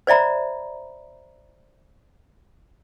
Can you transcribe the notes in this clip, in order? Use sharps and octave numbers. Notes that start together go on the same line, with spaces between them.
C5 D5 E5 A#5 B5